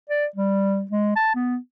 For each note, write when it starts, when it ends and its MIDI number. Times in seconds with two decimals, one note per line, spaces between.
0.10 0.26 74
0.36 0.84 55
0.91 1.13 56
1.16 1.33 81
1.35 1.57 59